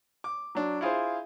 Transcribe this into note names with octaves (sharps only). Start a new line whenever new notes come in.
D6
F#3 D4
E4 F4 G#4 C5